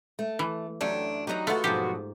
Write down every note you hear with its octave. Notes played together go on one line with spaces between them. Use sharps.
A3
E3
F#2 F#3 A3 D4 G4
F#3 D#4 G4 B4 A#5
G#3 A3 B3 F4 F#4
G#2 B2 F3 F#3 G4 C6